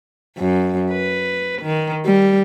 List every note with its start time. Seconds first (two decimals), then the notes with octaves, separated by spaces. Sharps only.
0.37 F#2
0.91 B4
1.62 D#3
2.05 G3